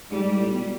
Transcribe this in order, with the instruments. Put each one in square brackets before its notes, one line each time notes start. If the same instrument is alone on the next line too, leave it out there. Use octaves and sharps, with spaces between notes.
[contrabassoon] G#2 [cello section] G3
[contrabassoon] G#2
A2
B2